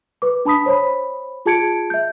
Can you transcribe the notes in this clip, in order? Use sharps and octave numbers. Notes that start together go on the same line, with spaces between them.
B4 D6
D4 A5 B5 D#6 B6
C5 C#5 B5
F4 G#4 A5 G#6 C#7 D7
E5 G6